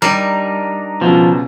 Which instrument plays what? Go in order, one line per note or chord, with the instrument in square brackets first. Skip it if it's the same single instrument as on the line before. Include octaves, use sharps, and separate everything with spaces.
[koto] G3 [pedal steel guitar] D4 D#4 A#4
[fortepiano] C#2 B2 [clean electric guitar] F3